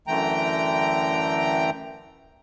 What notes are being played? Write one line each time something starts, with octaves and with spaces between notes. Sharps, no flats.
F#2 D3 E3 A3 G5 A#5